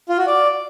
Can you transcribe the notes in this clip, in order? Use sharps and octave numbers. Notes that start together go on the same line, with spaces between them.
F4
F#4
D5